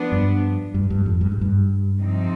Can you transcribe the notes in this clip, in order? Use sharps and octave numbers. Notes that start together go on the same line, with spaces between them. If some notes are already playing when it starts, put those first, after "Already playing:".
Already playing: F3 B3 D4
G2
G2
G2
F2
G2
G#2
G2
C3 F3 C4 D#4